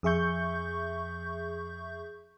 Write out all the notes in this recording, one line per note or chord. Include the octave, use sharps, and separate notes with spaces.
F2 G#4 E5 C#6 G6